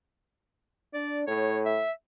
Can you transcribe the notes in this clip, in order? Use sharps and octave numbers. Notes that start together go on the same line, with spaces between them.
D4 D5
A2 C#5
E5